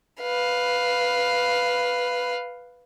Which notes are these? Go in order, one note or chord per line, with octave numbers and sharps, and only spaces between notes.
B4 F5